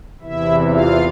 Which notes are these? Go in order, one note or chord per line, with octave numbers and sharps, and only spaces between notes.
E2 C3 E3 E4 E5
F4 F5